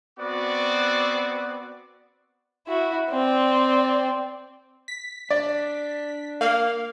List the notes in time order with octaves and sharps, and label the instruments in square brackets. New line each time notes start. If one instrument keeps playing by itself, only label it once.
[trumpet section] B3 C4 F#4 D5 D6
[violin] E4 F#4
C4 D5
[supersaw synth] B6
[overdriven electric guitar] D4 [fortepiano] D5
[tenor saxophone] A#3 [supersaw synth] F5